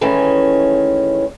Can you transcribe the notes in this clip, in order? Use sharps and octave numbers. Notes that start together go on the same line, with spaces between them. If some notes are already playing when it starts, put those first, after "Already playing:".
D#3 E3 G#3 A3 C#4